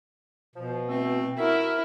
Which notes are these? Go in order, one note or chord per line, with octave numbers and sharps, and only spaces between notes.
B2 F3
E3 A3 C4
E4 F#4 A#4 E5